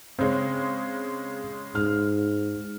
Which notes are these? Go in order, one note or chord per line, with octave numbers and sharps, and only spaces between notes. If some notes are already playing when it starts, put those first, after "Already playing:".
C#3 G#3 C4 C#5
G#2 F6